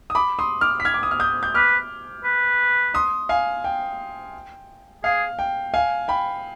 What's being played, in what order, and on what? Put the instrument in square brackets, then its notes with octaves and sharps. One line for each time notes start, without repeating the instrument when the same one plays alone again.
[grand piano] D#6
B5 D6
C6 D#6
D6 F6
B6
F6 G#6
D6
D#6
F6
D#6 G6
G6
[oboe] B4 [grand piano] D6 F6
[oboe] B4
[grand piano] C6 D#6
F5 G#5
G5
[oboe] G#4 [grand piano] F5
[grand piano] G5
F5 G#5
G5 B5